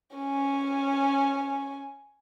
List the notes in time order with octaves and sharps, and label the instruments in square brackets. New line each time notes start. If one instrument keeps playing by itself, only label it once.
[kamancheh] C#4 G#5